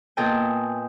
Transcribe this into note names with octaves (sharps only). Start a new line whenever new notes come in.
A#2 B3 A4 D#5 G5 G#5